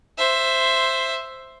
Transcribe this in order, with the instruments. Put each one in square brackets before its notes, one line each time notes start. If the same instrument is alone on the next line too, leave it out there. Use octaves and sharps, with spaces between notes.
[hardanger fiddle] C5 E5